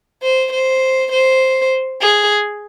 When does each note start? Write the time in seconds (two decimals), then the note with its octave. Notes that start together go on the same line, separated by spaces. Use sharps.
0.23 C5
0.53 C5
1.13 C5
2.02 G#4